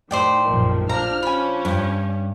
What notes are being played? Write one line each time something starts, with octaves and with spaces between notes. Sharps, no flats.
A2 D#3 C5 D5 G5
A#1 F#2 D#3 F3
F3 D4 A#5 F6
C#4 D4 G#5 B5
G2